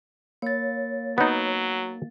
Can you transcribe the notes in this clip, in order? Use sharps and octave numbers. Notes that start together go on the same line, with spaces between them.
A#3 C#5 A6
F#3 B3 D#4